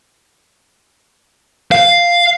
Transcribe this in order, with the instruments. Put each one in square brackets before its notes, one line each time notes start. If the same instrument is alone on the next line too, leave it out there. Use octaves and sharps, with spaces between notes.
[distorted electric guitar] F5